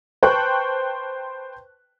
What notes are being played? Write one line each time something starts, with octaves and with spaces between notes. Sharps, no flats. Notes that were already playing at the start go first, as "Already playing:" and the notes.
B4 C5 G5 A5 C#6 F#6